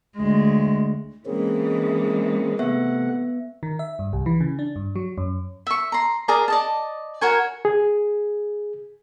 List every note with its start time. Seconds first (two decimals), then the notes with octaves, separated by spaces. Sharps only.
0.17 D2 G#3
1.26 E3 G#3 A#3 C4 C#4 G#4
2.59 C3 A3 B3 E5 F#5
3.63 D#3
3.79 E5
3.99 G2
4.13 C2
4.26 E3
4.40 C#3
4.59 D4
4.76 G2
4.96 F#3
5.18 F#2
5.67 E5 C#6
5.92 A#5 C6
6.28 G#4 A#4 D5 A#5
6.48 D5 D#5 A5
7.21 F#4 A#4 C#5 G#5
7.65 G#4